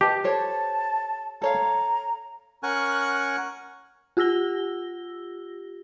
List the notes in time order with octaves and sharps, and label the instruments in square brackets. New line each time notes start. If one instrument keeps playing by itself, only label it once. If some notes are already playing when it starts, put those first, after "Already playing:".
[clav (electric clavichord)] G4 [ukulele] B4 D#5 A5
[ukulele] A4 C5 C#5 [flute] A5
[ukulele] A4 C#5 F5 [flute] A#5
[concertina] C#4 A#4 F#5 G#5 C#6 F#6
[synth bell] F4 G4 E6 A#6 G7